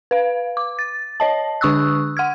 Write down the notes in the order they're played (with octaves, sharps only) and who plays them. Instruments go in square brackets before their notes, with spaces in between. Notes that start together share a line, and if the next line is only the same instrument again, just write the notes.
[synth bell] B4 F5
D6
A6
C#5 D#5 A5
D3 D4 C#6 D#6 E6 F#6
F#5 F6 G#6